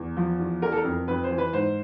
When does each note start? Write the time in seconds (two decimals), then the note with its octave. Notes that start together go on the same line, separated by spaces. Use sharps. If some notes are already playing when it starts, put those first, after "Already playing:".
Already playing: E2
0.17 F3
0.39 E2
0.62 E3 A#4
0.72 A4
0.77 A#4
0.85 F2
1.08 F2 B4
1.24 C5
1.31 E3
1.38 B4
1.53 G#2 C5